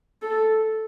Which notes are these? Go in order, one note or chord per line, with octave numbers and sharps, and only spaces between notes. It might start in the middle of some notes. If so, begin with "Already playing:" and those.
A4